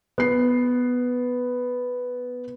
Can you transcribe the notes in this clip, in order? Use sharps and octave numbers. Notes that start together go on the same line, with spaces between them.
B3 C7